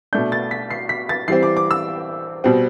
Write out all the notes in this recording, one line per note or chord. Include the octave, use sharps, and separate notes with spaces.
B2 A3 D4 G6
A6
B6
C7
B6
A6
E3 G3 C4 C7
D6
D6
E6
B2 G3 C4